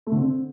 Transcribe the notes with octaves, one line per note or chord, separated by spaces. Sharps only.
A3
D3
C4